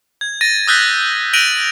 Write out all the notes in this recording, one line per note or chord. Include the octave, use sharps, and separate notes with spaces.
G#6
A6 A#6 D#7
D#6 E6 F#6 G6 A6 B6
F#6 A#6 D7 D#7 F7 F#7